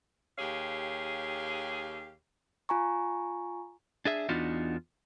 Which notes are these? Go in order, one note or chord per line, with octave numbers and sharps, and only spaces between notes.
D#2 G4 G#4 C#5 F5
F4 G#5 A#5 C#6
D4 G#4 E5
E2 B3 D4 D#4 F4 F#4